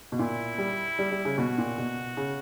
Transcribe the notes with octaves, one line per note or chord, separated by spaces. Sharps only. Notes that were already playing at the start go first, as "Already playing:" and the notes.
B2
A#2 E4
G3
G3
G3
C#3
B2 F#4
A#2
B2
C#3